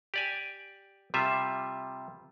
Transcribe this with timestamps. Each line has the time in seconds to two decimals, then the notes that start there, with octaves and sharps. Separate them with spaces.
0.14 G4 D5 G#5
1.14 C3 G3 F4 E5